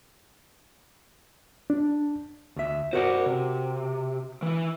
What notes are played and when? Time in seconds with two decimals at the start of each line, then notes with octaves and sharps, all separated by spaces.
1.70 D4
2.56 D2 E5
2.93 F#4 A#4 C5 D5 F#5
3.26 C3
4.42 E3 E4